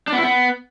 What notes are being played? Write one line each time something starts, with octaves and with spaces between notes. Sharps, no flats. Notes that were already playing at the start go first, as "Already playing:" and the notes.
D4
B3
E4
B3